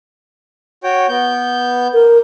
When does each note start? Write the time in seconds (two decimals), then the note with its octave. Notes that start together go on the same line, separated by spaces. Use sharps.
0.84 F#4 C#5 G5
1.09 B3 G6
1.94 A#4